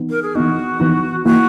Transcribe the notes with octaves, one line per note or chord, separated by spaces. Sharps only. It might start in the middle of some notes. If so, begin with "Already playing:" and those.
Already playing: E3 B3 D#4
A#4
G#4
E3 B3 D#4 F#4
E3 B3 D#4
E3 A#3 E4 F#4